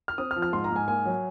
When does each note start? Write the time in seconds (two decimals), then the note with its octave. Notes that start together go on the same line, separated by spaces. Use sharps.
0.08 F6
0.18 C4 D#6
0.31 F6
0.36 F3
0.42 F6
0.53 G#2 C6
0.64 A#5
0.71 G#2 G#5
0.88 A#3 G#5
1.05 F#3